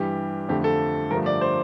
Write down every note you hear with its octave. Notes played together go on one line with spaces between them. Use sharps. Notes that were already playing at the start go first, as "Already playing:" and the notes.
Already playing: G2 E3 G3 G4
F2 D3 F3 A3 G4
A4
G2 D3 F3 A3 A#4
D5
C5